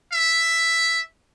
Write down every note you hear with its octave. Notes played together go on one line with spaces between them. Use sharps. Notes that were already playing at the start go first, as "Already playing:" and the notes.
E5